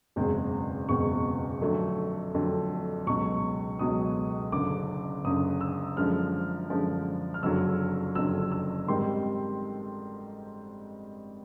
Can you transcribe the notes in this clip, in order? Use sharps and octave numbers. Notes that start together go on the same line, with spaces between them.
F#1 E2 B2 G#3 C4
F#1 E2 B2 G#3 C4 C#6
F2 D3 F#3 A3
F2 D3 F#3 A3
C#2 B2 F#3 C#6
C#2 B2 F#3 D#6
F#1 F#2 D3 D6
F#1 F#2 D3 D#6
E6
F#2 D3 F3 G#3 F6
F#2 D3 F3 G#3
F6
F#1 F2 D3 F#3 E6
F#1 F2 D3 F#3 E6
E6
G#2 D#3 G3 C4 C6